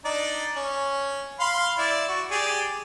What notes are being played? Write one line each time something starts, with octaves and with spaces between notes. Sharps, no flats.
D4 D#4 D5
C#4
F5 B5 C6
E4 D5
F#4
G4 G#4 D5